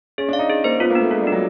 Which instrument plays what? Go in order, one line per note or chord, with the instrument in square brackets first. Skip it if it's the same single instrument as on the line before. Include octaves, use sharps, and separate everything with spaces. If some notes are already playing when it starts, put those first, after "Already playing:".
[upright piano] C#4 [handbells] G#4
[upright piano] D4 [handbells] F5
[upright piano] D#4
[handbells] G#4
[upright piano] A#3 [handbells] C5
[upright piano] B3 [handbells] F4
[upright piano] A#3
[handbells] D4
[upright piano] A3
[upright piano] G#3 [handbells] F4
[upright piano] G3
[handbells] D4
[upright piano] F#3